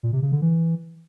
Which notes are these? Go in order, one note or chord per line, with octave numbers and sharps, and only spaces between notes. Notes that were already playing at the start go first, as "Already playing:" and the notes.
A#2
C3
C#3
D3
E3